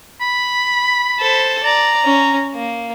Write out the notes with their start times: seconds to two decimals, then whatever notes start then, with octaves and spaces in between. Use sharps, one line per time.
0.21 B5
1.20 A4 C5
1.64 D5 A#5
2.04 C#4
2.54 A#3